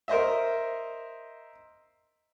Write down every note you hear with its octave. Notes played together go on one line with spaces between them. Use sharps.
A#4 C5 D#5 E5